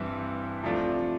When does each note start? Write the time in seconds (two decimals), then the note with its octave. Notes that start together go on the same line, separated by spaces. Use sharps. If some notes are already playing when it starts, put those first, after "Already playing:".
Already playing: G2 E3 G3 C4 E4
0.63 C3 F3 A3 D4 F4